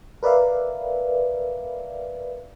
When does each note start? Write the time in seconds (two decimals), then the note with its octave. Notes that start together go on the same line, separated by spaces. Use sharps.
0.23 A#4 B4 D5 E5 F5